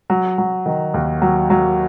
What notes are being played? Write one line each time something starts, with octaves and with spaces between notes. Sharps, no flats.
F#3
F#3
D#3
D#2
F#3
F#3